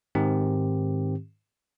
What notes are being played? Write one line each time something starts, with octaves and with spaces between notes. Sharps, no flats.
G#2 D#3 C4 G4